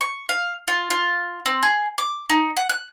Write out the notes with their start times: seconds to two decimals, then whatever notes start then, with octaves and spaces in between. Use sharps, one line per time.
0.01 C#6
0.29 F5
0.68 F4
0.90 F4
1.46 C4
1.63 G#4
1.98 D6
2.30 D#4
2.57 F#5
2.69 F#6